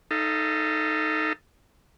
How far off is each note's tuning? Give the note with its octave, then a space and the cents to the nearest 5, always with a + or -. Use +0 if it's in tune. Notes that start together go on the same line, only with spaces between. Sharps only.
D#4 +0 A4 +0 F5 -40